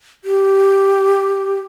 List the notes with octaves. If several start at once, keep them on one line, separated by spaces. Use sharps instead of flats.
G4